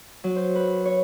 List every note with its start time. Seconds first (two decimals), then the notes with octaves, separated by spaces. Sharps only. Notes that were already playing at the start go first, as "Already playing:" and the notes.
0.24 F#3
0.36 C5
0.56 B4
0.85 C#5